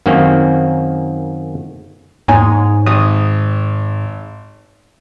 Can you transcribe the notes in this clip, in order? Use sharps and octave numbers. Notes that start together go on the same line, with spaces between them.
F#2 D#3 A#3 C4 C#4
E2 G#2 C#5 G#5 A#5
G#1 D#6